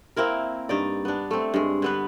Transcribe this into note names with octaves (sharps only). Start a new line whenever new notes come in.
A#3 C4 E4 A#4
G2 D#4 D5
B3 D4
A3 C4
G2 G#3
D3 B3 B4